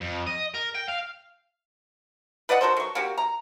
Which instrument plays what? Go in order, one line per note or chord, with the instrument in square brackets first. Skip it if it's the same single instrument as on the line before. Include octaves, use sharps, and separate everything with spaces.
[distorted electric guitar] F2
D#5
A#4
G5
F5
[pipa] B4 D5 D#5 F#5
F#4 A4 A#4 C5
F#3 C#6
A#3 F#4 G4
A#5